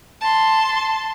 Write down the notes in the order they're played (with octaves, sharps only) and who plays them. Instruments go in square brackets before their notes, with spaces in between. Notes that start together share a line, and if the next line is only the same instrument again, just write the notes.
[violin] A5 C6